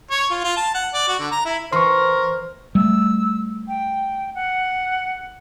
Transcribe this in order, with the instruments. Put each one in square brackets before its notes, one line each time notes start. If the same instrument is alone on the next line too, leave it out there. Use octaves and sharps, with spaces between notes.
[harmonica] C#5
F4
F4
A5
F#5
D5
F#4
D3
A#5
E4
[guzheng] E3 [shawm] A#4 [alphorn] C5 [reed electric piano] C6 C#6
[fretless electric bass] G3 A3 [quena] E6
[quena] G5
F#5